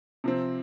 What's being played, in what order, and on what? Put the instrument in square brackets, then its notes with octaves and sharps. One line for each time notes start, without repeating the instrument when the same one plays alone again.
[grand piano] C3 F3 C4